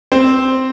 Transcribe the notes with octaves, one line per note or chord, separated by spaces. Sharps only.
C4 C5